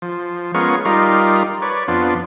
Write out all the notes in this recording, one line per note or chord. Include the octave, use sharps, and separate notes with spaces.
F3
G#3 B3 C#4 F4 A#4 C#6
G3 D#4 F4 A#4
B4 C#5 D5
F2 B3 D4 F4